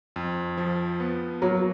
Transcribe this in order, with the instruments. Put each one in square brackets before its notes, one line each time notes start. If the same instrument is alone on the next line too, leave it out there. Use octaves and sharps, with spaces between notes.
[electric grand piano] F2
F3
B3
[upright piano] F#3 [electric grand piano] A#3